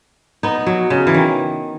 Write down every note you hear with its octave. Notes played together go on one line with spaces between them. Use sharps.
B3 D#4
F#3
C#3
E3
D#3